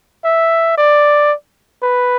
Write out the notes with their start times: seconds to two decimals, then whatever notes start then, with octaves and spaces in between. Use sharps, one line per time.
0.25 E5
0.78 D5
1.84 B4